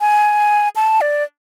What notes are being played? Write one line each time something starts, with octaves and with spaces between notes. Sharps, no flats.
G#5
A5
D5